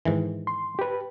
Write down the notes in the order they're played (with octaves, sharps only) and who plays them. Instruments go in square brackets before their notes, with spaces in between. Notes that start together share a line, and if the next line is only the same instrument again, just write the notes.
[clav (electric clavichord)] G#2 D#3 E3
[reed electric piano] C6
G4 B4